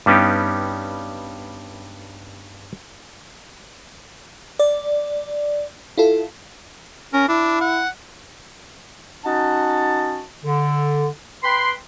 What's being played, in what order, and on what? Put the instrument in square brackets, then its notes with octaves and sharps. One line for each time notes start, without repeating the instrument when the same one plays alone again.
[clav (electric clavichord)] G2 G3 B3 C#4 D#4 G4
[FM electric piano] D5
E4 F4 A4
[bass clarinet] C#4 [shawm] A#4
[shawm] D4 [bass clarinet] E4
[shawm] F#5
[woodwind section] C#4 D#4 F#4 D#5 F#5 A5
D3
B4 G5 B5 C6